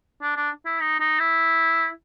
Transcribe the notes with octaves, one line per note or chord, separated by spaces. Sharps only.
D4
D4
E4
D#4
D#4
E4